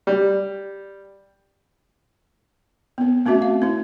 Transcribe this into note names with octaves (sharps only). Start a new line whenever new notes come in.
G3
B3 C4
A3 C4 C#4 F#4 E5
F5
C4 E4